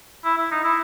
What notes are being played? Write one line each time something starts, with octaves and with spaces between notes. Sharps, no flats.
E4
E4
D#4
E4